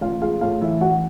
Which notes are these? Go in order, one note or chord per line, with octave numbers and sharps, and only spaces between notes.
A1 F4 F5
G#3 F4 F5
A2 F4 F5
E3 E4 E5
A1 F#4 F#5